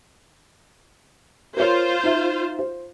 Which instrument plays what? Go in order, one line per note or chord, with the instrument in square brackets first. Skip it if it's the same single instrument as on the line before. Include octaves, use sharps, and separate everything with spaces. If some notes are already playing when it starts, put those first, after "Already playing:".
[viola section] F4 C5 [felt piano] A#4 C#5
[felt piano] D#4 E5
C5